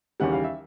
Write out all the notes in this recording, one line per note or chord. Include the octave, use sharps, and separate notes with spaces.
D#2 C#3 E3 G3 F#5
F5
E5